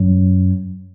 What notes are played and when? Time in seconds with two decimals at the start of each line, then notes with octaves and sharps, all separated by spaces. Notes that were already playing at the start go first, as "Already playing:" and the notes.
Already playing: F#2